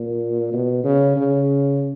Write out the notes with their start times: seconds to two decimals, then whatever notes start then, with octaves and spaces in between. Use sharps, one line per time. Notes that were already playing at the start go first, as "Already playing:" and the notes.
Already playing: A#2
0.53 B2
0.84 C#3
1.16 C#3